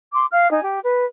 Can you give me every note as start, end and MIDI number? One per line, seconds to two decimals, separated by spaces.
0.12 0.26 84
0.12 0.26 86
0.31 0.48 77
0.31 0.48 89
0.50 0.61 63
0.50 0.61 80
0.62 0.78 67
0.84 1.05 71